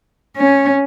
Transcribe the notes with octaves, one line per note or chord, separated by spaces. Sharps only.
C#4